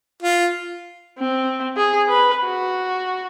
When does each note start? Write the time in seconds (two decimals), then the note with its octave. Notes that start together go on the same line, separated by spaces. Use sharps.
0.22 F4
1.19 C4
1.77 G#4
2.08 B4
2.45 F#4